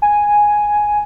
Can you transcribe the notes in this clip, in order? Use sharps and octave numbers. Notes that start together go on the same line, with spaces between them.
G#5